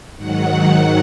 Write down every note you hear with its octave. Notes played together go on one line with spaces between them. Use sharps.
G#2 D#3 F#3 F#5